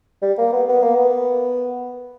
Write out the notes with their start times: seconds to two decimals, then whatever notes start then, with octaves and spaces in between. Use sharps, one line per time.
0.22 G3
0.38 A#3
0.53 B3
0.69 B3
0.82 A#3
0.95 B3